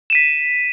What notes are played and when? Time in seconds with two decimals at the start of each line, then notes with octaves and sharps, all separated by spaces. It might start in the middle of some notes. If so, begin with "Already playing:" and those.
0.10 E7
0.13 D#7
0.15 B6